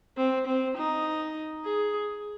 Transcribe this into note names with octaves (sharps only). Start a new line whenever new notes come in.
C4
C4
D#4
G#4